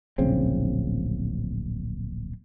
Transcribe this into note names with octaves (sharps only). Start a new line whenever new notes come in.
D1 A#1 C#3 C4